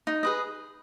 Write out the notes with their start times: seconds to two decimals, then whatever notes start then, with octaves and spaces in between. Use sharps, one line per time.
0.07 D#4
0.23 G#4 B4 D#5